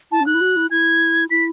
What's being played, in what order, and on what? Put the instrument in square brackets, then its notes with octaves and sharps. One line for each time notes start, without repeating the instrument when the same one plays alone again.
[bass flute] E4 [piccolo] A5
[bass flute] C#4
[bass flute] D#4 [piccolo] F#6
[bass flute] E4
F#4
E4
[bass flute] E4 [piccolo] G#6
[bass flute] E4 [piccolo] B6